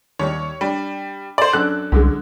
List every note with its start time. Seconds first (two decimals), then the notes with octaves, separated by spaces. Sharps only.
0.19 D#2 G3 C#5
0.61 G3 D4
1.38 C5 D5
1.53 F#2 D4 A4 F#6
1.92 C2 F#2 D3 G#3